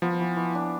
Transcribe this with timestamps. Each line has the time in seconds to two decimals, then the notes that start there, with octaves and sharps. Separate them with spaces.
0.02 F3 B3
0.20 E3
0.37 E3
0.55 D4